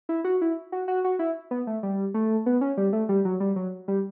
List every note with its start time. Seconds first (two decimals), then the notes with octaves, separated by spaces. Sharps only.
0.09 E4
0.25 F#4
0.41 E4
0.72 F#4
0.88 F#4
1.04 F#4
1.19 E4
1.51 B3
1.67 A3
1.83 G3
2.14 A3
2.46 B3
2.61 C#4
2.77 G3
2.93 A3
3.09 G3
3.25 F#3
3.40 G3
3.56 F#3
3.88 G3